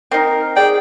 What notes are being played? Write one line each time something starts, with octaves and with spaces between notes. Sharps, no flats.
C4 D#4 A#4
G#4 D5 G5